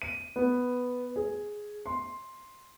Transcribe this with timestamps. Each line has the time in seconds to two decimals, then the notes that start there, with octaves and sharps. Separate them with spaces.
0.02 D#7
0.36 B3
1.16 G#4
1.86 C6